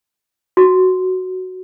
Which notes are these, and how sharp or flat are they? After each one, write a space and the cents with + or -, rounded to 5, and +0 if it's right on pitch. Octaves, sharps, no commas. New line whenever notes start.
F#4 +5